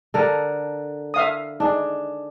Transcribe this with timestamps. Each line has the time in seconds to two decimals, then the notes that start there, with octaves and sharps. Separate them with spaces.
0.14 D3 A4 A#4
1.14 E5 F5 D#6
1.60 D4 D#4 G#4